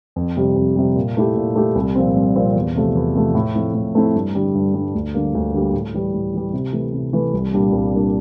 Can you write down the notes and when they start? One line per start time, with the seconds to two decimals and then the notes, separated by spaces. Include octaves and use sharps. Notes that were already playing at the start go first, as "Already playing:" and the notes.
0.16 F2
0.37 C3 G3
0.56 F2
0.76 C3 G3
0.96 A#2
1.17 A3 E4 G4
1.37 A#2
1.56 A3 E4 G4
1.75 C2
1.95 A#2 F3 C4
2.16 C2
2.36 A#2 F3 C4
2.56 E2
2.75 C3 F3 A3
2.95 E2
3.15 C3 F3 A3
3.35 A2
3.55 F3 A3 C4 E4
3.74 A2
3.95 F3 A3 C4 E4
4.15 G2
4.35 D3 G3 D4
4.55 G2
4.74 D3 G3 D4
4.95 D2
5.14 D3 G3 A#3
5.35 D2
5.54 D3 G3 A#3
5.73 A2
5.94 E3 G3
6.14 A2
6.34 E3 G3
6.53 C3
6.73 E3 A3
6.94 C3
7.13 E3 A3
7.34 C2
7.53 A#2 G3 A#3 D4
7.72 C2
7.92 A#2 G3 A#3 D4